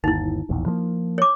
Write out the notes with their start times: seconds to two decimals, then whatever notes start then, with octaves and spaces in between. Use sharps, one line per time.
0.04 G1 D#2 D#4 E4
0.49 E1 A#1 E2
0.66 F3 G#3 A#3
1.18 C#5 D6